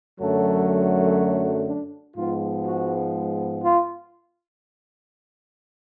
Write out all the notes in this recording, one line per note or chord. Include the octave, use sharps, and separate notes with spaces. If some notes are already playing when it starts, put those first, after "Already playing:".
F#2 D3 F#3 A3 A4
D4
G#2 F3 G#3 B3 F4
F#4
F4